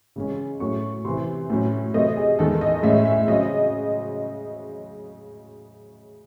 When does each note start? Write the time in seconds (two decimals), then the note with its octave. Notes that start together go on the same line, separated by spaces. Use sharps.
0.16 C#3 G#3 C#4
0.60 A2 F#3 A3 C#4 C#6
1.04 C3 E3 C4 C6
1.50 A2 F#3 C#4
1.94 C3 F#3 A3 C4 D#5
2.17 G#4
2.38 E2 D#3 G#3 A4
2.61 D#5
2.83 A2 G#3 C#4 E5
3.05 E5
3.28 C#3 F#3 C4 D#5